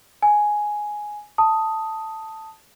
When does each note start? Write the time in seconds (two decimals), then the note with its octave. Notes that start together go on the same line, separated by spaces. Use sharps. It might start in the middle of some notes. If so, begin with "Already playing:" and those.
0.22 G#5
1.38 A5 D#6